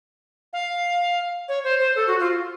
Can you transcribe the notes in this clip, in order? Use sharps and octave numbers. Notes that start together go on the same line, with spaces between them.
F5
C#5
C5
C5
A4
F#4
F4